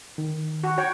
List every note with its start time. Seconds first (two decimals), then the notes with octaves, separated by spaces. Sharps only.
0.18 D#3
0.64 F#4
0.78 F#4 C#5 G5